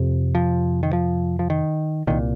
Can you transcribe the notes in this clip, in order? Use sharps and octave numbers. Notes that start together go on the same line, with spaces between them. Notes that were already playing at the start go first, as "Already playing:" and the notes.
Already playing: F2 C3
F3
D#3
F3
F3
D#3
C2 A#2 D#3